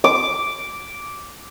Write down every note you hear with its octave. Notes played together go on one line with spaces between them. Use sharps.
D6